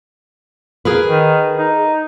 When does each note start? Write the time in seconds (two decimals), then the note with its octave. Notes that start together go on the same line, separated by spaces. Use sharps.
0.85 G#4 A#4 B4
1.07 D#3
1.58 D#4